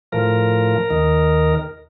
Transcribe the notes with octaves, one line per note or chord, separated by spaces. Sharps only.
A2 F3 A#4
D#2 D#3